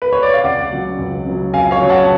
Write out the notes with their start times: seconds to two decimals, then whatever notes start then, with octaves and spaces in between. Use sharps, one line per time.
0.02 B4
0.13 C#5
0.23 D5
0.34 F5
0.44 C#2 D5 F#5
0.72 C#3 F#3
0.99 C#2
1.26 C#3 F#3
1.53 C#2 F5 G#5
1.71 C#5 F5
1.80 C#3 F#3
1.89 F#5 A5